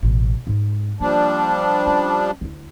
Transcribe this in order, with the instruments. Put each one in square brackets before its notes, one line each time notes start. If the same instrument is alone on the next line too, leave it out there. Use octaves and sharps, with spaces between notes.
[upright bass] A1 B2
G#2 G#3
[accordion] F3 G3 D4 [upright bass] A#3
[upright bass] C#4
D2 E4